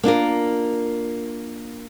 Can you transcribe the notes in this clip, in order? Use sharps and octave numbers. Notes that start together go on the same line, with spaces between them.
A#3 D4 F4 A#4